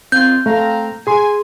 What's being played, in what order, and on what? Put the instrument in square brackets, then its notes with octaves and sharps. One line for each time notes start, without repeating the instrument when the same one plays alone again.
[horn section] D#3 F4 [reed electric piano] C4 [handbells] G6
[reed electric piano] A3 [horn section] C4 F5 A#5
[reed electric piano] G#4 C6 [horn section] G#5